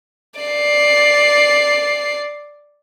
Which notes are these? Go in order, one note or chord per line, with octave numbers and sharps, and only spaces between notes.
D5 C7